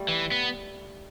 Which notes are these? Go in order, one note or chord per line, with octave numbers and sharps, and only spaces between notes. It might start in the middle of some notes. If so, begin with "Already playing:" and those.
Already playing: G3 A3
E3
B3